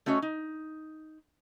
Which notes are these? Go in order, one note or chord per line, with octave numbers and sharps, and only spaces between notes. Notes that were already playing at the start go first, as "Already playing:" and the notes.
A3 C#4 F#4 C#5 D#5
D#4